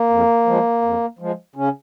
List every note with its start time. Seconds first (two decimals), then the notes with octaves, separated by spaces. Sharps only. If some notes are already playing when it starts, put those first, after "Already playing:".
Already playing: A#3
0.09 F2
0.46 F3 G#3
0.82 F2
1.19 F3 G#3
1.56 C#3 C#4